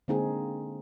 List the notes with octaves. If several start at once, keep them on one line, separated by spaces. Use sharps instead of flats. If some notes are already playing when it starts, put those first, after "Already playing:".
D3 G#3 A#3 C4 D#4 G#4